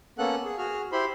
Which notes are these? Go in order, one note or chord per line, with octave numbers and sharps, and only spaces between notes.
A#3 B3 C#4 A4 F#5 F#6
G#4
F#4 G#4 F6
E4 G4 C5 B5 C6